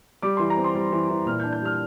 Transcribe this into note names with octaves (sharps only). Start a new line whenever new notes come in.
G3 D6
E3 C6
A#5
C4
C6
G3
E3
E3
A#2 F6
D4 G6
G6
G3 F6